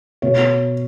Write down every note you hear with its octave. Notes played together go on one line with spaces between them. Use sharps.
B2 C#5